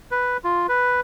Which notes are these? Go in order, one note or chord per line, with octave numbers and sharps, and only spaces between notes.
B4
F4
B4